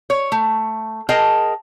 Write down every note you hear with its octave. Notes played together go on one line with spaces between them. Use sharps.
C#5
A3
G#4 A#4 D#5 G5 A5